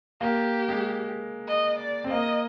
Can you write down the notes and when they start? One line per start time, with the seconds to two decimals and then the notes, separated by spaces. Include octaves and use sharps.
0.21 A#3 G4
0.68 G#3
1.47 D#5
1.79 D5
2.04 C4
2.10 A#3 D#5